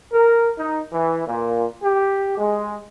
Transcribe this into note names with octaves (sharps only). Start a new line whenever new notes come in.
A#4
D#4
E3
A#2
G4
G#3